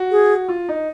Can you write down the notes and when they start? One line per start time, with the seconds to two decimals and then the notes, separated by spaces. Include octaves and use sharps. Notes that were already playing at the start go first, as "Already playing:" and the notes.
Already playing: F#4
0.11 G#4
0.49 F4
0.69 D#4